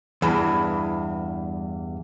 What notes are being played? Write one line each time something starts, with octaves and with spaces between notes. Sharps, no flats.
E2 G2 E3